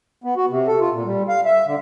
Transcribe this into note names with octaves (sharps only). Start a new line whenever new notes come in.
B3
F#4
C3
A4
F4
A#2
G3
F5
E5
D3